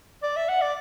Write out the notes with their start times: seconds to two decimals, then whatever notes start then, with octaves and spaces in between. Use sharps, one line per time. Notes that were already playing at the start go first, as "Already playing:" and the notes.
0.22 D5
0.36 E5
0.49 F#5
0.61 D5